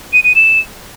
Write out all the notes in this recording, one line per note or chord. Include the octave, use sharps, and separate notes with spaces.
D#7
D#7
E7